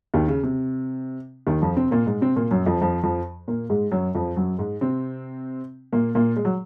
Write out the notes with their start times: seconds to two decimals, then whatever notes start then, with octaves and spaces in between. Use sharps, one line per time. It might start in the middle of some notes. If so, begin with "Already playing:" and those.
0.14 D#2 D#3
0.28 C#3
0.43 C3
1.47 D#2 D#3
1.62 F2 F3
1.77 C3 C4
1.91 A#2 A#3
2.06 G#2 G#3
2.21 C3 C4
2.36 A#2 A#3
2.51 F#2 F#3
2.66 F2 F3
2.81 F2 F3
3.03 F2 F3
3.48 A#2 A#3
3.70 G#2 G#3
3.92 F#2 F#3
4.15 F2 F3
4.36 F#2 F#3
4.59 G#2 G#3
4.81 C3 C4
5.93 A#2 A#3
6.15 A#2 A#3
6.36 G#3
6.45 F#3